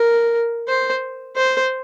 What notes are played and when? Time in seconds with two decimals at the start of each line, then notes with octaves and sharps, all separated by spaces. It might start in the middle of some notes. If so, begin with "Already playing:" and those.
Already playing: A#4
0.68 C5
1.36 C5